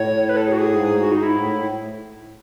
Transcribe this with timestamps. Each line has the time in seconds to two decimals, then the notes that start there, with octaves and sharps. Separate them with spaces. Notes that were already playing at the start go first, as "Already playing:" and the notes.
Already playing: A2 C#5
0.29 B4
0.37 A4
0.47 G#4
0.53 F#4
0.58 G#4
0.69 G#2
1.01 F#4
1.12 D#4
1.23 E4
1.34 A2